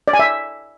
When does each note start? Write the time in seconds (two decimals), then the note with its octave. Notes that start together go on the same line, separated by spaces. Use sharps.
0.08 D5
0.13 G#5
0.19 E5